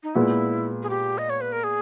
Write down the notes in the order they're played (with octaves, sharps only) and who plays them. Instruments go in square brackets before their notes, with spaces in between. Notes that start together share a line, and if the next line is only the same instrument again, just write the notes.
[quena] D#4
[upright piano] A#2 G#3 B3 [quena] E4
[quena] G#4
G4
D#5
C#5
B4
A#4
G#4